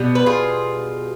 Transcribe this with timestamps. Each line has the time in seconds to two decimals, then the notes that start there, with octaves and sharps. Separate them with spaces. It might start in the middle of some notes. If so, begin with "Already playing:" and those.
Already playing: B2 G3 B3
0.15 B4
0.26 F4 G#4